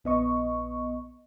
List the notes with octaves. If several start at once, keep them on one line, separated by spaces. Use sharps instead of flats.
A#1 B3 D#5 C#6